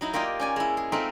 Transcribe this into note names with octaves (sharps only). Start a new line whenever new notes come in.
F#3 D#4 E4
A#3 F4 G4 D5 D#5
C#4 D5 G#5
G#3 E4
G#4
A3 C4 D#4 F4 A#4 E5